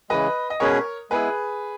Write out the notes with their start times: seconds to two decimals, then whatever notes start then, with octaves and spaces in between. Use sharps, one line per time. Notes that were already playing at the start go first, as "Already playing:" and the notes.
0.10 C#3 E3 G#3 B4 D#5
0.50 D#5
0.60 B2 G#3 C#4 G#4 A#4 B4 C#5
1.11 G#3 B3 E4 G#4 B4